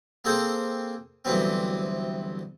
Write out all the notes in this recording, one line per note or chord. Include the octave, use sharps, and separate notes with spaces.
A#3 C4 G#4 A4 C5
D2 G2 E3 F#3 B3 C4